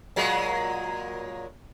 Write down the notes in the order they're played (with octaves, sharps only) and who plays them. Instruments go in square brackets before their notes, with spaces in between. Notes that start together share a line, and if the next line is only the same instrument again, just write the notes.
[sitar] A#2 F#3 G#3